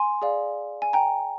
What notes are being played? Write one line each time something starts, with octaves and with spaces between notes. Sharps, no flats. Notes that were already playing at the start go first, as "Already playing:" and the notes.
Already playing: G#5 C6
G#4 D5 F5
G#5
G5 A#5